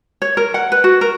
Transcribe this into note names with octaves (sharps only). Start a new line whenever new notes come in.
C#5
A#4
F#5
B4
F#4
A#4